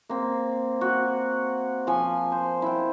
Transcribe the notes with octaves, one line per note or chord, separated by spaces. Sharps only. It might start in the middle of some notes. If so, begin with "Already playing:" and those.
A#3 C4
F#4
F3 G#5
C5
E4 G5